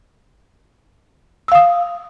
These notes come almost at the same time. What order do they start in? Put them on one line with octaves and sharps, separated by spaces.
E6 F5 D#6